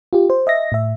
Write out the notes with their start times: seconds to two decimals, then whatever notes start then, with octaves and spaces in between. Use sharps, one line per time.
0.13 F4 G4
0.30 C5
0.47 D#5 E5 A#6
0.72 A2 E5